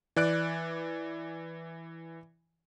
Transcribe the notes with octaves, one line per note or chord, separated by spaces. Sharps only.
E3 D5 F#6 D7